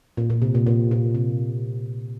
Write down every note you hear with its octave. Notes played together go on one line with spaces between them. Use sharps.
A#2
A#2
C3
A#2
A#2
A#2
C3